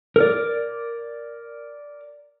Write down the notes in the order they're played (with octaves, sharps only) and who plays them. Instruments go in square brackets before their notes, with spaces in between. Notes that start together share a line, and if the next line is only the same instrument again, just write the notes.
[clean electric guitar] A#4 D5